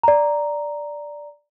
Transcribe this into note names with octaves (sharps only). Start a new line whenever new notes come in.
D5 A#5